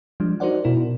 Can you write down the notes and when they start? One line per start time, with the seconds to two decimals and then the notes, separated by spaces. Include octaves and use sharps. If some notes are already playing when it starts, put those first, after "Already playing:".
0.20 F3 G3 G#3 D4
0.40 D#4 F#4 A#4 C5 D5 F#5
0.64 B2 E4 A#4